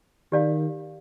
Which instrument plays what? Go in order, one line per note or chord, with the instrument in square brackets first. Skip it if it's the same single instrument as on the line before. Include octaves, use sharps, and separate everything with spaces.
[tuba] D#3 [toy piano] G4 D5 F5